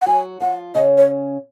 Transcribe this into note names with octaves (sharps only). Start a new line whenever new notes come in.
F#5
F#3 F#4 G#5
F3 F4 F#5
C#3 C#4 D#5
C#5